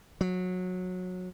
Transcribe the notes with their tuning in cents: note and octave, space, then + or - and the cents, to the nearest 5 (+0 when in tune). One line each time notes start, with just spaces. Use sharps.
F#3 -20